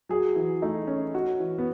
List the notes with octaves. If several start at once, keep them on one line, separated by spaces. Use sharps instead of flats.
F#3 G#4
E3
A3 D#4
C#4
F#4
E3
B3